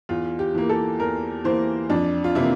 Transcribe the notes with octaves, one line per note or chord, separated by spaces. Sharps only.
E2 F4
G4
E3 A#3
A4
E2 A#4
E3 A#3 C5
F2 D4
F4
C3 E3 A#3 E4